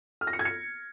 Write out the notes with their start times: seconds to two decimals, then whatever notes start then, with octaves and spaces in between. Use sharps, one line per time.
0.21 F6
0.27 A#6
0.33 C#7
0.39 G#6
0.45 C#7